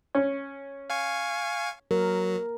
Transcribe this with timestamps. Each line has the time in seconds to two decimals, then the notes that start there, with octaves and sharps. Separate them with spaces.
0.15 C#4
0.90 F5 G#5 C#6
1.91 F#3 A#4